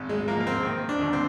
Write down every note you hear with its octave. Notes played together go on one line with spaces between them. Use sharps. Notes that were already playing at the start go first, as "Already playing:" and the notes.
Already playing: G#1
G#3
F3 A#3
A#3
C4
D#3
D4
D#2
C4